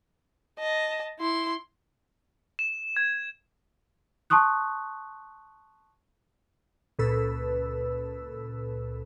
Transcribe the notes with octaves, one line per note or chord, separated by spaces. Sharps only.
D#5 A5
E4 C6
E7
G#6
A5 C6 C#6 D#6 F#6
C#2 A#2 A4 B4 E6